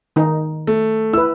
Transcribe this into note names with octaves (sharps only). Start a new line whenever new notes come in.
D#3 D#4
A3
E4 B4 E6